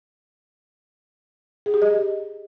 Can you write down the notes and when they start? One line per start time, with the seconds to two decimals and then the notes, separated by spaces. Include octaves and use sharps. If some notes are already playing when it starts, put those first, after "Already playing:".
1.66 G#4
1.74 G4
1.82 D#5